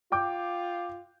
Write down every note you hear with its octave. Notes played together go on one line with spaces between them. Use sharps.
F4 G5 D6 G6